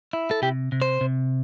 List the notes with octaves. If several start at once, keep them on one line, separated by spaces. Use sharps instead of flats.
E4
A4
C3 G4
C3
C5
C3